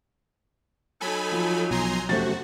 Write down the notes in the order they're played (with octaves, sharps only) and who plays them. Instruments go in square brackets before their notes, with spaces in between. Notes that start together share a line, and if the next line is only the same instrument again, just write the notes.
[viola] F#3 D#4 [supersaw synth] A4 G#5 B5
[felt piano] F3
[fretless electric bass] B1 [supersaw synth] G#5 A#5 C6
[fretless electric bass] F1 F#2 A3 [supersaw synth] F#4 [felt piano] G4 C5 A6